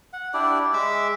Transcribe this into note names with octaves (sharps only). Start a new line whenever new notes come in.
F#5
D4 E4 G4 D5
G#3 E5 D6 E6